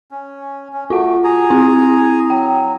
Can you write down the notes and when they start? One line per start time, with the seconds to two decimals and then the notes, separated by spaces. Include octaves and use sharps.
0.11 C#4
0.73 C#4
0.90 A3 F4 F#4 F#5
1.24 G#4 G#5 A#5
1.50 C4 E4
2.30 F#3 G5